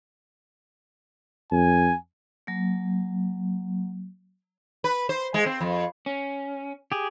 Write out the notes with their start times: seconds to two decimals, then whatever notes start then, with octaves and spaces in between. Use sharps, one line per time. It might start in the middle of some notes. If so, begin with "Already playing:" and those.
1.51 F2 G#5
2.47 F#3 A#3
4.84 B4
5.09 C5
5.34 G#3
5.46 C4
5.61 F2
6.06 C#4
6.92 G4 G#4